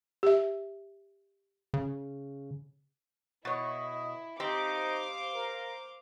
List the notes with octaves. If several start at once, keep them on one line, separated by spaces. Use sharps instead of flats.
G4 E5
C#3
B2 E4 C#5 D#5
C4 D#4 G4 C5 F5 D6
A#4